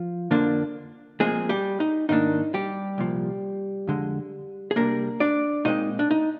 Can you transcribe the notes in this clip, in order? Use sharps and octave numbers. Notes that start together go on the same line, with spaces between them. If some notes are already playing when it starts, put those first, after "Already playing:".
Already playing: F3 F4
F2 D3 F3 A#3 D4
A#2 F3 G#3 C4 G#4
G3 G4
D#4
G#2 D#3 A#3 D4 D#4
G3 G4
C2 A#2 F3
F2 D3 G#3
G#4
C3 G3 A#3 D4 A#4
D4 D5
A#2 G#3 C4 D#4 D#5
D4
D#4